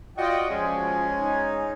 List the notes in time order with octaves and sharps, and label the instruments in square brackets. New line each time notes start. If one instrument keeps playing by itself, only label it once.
[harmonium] F4 D5 G5 [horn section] F#4 D#5
[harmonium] F3 [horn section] G#3 C#4 G#5
[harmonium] D#4